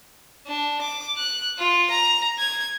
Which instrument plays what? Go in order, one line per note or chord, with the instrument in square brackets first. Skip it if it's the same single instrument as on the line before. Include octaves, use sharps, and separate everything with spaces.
[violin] D4
D6
F#6
F4
A#5
G#6